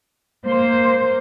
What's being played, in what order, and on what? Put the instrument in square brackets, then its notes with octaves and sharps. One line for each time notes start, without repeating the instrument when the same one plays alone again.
[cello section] A#3 C5